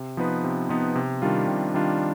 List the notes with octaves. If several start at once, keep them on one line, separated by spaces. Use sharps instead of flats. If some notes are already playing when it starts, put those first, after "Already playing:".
Already playing: C3
F3 B3 D#4 B4
C3
F3 B3 D#4 B4
C3
D#3 G3 D4 F4
C3
D#3 G3 D4 F4